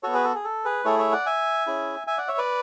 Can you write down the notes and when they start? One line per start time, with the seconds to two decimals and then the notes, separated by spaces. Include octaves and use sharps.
0.03 B3 F#4 A4 C#5
0.13 G#4 B4
0.24 A4
0.35 G#4
0.44 A4
0.65 G#4 B4
0.85 A3 E4 G#4 A4 C#5
0.98 C#5 E5
1.13 D5 F#5
1.26 E5 G#5
1.67 C#4 E4 G#4
2.07 E5 G#5
2.18 D5 F#5
2.28 C#5 E5
2.38 B4 D5